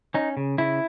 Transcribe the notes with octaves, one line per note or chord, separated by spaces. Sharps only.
C#4 D#4
C#3
C#3 E4